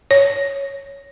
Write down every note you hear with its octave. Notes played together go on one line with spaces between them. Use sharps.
C#5